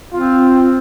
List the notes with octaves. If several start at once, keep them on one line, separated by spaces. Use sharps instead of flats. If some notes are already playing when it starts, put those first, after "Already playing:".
C4 F4